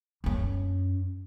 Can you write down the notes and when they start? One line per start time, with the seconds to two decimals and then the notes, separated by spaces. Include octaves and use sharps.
0.24 F#2 C#4